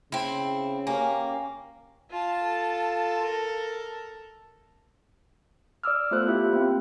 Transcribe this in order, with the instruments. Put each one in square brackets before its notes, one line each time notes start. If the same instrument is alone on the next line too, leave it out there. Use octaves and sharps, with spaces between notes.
[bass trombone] C#3 [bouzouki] C4 E4
[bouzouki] A#3 [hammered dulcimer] C#4 G4 A#4 [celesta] G#5 A#5
[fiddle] F4 A5
[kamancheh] A4
[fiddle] A#4
[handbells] D5 D6 E6 F6
A3 B3 F4 A4 C5 F#6
E4 F4 G4 E5
A#3 C4